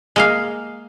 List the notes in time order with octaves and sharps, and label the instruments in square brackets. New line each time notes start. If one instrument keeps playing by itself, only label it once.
[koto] G#3 A#3 F5